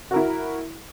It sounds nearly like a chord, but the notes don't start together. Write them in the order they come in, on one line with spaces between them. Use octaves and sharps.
F#4 A#4 E4